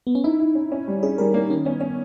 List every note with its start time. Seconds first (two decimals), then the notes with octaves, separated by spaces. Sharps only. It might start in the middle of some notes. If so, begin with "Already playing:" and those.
0.07 B3
0.15 C#4
0.24 D#4 E4
0.40 E4
0.55 C#4
0.72 C#4
0.88 G3
1.03 C#4 G#4
1.18 G3 A#4
1.34 A#3
1.50 D#3 C#4
1.65 B3 C#4
1.81 C#4